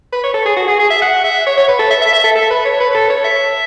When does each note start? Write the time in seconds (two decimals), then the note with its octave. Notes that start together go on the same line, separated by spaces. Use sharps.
0.12 B4
0.23 C#5
0.34 A4
0.46 G#4
0.57 F#4
0.68 G#4
0.79 G#4
0.90 E5
1.02 F#5
1.24 E5
1.47 C#5
1.57 C#5
1.68 B4
1.79 A4
1.90 E5
2.02 E5
2.13 E5
2.24 A4
2.35 A4
2.50 B4
2.65 C#5
2.80 B4
2.90 B4
2.95 A4
3.10 C#5
3.24 E5